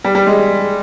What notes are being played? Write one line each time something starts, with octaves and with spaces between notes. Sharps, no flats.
G3
G3
G#3